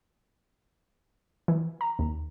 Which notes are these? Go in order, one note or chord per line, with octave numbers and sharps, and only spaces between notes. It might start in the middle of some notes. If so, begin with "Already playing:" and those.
E3
A#5
D#2